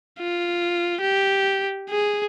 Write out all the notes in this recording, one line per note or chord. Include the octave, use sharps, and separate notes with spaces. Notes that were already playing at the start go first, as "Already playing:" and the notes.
F4
G4
G#4